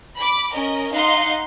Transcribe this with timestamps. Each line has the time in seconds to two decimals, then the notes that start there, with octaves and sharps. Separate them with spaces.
0.17 B5 D6
0.54 C#4 A#4 D#5
0.93 D#4 F5 F#5 C6